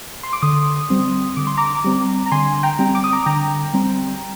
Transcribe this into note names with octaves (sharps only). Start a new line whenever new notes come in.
C6
D6
D3 C6 D#6
G3 C4
D3 D6
C6
A#5 D6
G3 C4
A#5
D3 G#5 C6
G5 A#5
G3 C4
D6
D#6
A#5 D6
D3 G5 A#5
G3 C4